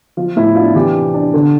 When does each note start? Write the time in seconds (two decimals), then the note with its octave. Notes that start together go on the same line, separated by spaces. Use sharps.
0.17 F3 F4
0.36 A2 E4
0.55 D4 F4
0.75 E3 G4
0.95 C3
1.14 D4
1.34 D3